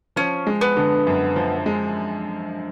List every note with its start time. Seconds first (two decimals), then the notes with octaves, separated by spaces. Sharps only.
0.16 F3 C#4
0.47 G#3
0.61 B3
0.77 D3
1.07 F#2
1.36 F3
1.66 G#3